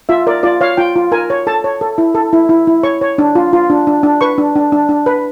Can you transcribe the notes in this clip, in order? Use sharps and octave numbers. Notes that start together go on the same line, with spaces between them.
F4 E5
A#4 D5
F4 D5
C#5 F5
F4 G5
F4
A#4 G#5
C#5
A4 A5
C#5
A4
E4
A4
E4
E4
E4
C#5 C#6
C#5
D4
F4
F4
D4
D4
D4
B4 C#6
D4
D4
D4
D4
B4